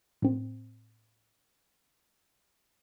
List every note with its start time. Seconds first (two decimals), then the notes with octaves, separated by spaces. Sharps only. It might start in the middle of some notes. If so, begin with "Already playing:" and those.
0.22 A2 C4